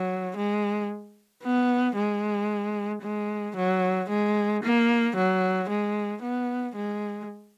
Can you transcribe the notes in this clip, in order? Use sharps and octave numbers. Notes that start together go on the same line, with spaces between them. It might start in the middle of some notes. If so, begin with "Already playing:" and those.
Already playing: F#3
G#3
B3
G#3
G#3
F#3
G#3
A#3
F#3
G#3
B3
G#3